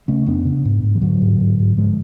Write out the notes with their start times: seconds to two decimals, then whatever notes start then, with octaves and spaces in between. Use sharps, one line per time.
0.08 C#3 A3 C#4
0.26 F2 B3 D4
0.45 C#3
0.65 G#2
0.83 G#2
0.95 F3
1.02 G#2 D3 F#3
1.22 G#2
1.40 G#2
1.59 G#2
1.77 G#2 F3 G#3